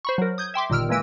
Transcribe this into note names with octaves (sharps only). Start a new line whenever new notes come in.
C5 B5 C#6
F#3 A#4
D#6 G6 G#6
E5 G5 C6 D6
G1 A#2 D#3 E6 F6 D7
E3 G#3 A#3 B4 E6 D7